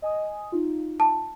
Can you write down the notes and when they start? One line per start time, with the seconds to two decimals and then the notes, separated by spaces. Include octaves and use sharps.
0.02 D#5 G#5 D#6
0.52 D#4 F4
1.00 A5